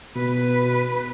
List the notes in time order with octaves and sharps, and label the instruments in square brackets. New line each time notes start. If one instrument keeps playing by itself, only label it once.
[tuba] B2 [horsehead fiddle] B4